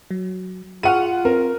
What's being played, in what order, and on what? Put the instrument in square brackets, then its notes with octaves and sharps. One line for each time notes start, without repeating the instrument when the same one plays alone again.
[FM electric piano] F#3
[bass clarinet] F4 [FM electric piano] G#4 C#6 F6 [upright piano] F#5 D#7
[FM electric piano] C4 [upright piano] A#4